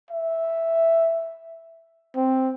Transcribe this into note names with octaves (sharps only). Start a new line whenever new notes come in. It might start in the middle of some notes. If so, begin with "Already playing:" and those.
E5
C4